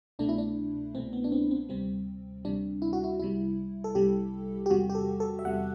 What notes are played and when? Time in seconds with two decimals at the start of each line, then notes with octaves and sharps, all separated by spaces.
0.19 C2 B2 A3 D4
0.29 E4
0.38 D4
0.94 C2 B2 A3 C4
1.13 B3
1.24 D4
1.32 C4
1.51 C4
1.69 D2 C3 G3 C4
2.45 D2 C3 G3 D4
2.82 E4
2.93 F#4
3.04 E4
3.20 C2 C3 G3 E4
3.84 A4
3.95 C2 C3 G3 G4
4.66 G4
4.70 E2 C3 G3 F#4
4.90 G4
4.95 A4
5.20 A4
5.39 E5
5.45 E2 C3 G3 F#5